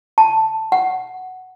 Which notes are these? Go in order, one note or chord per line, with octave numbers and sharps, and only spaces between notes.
A5
F#5